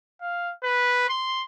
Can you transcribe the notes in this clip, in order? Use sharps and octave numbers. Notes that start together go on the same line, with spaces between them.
F5
B4
C6